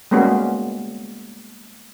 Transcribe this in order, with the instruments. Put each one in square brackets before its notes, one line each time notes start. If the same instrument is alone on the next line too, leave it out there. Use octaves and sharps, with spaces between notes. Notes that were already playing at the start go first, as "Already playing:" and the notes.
[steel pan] G3 G#3 A#3 B3 C#4 F#4